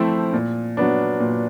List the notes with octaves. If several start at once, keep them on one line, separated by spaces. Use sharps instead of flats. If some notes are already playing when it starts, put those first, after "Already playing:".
Already playing: F3 A3 C4 E4
A#2
F#3 B3 D4
A#2